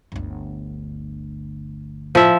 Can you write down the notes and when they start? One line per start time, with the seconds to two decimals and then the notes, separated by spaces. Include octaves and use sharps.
0.12 G1 D2
2.15 A2 F3 E5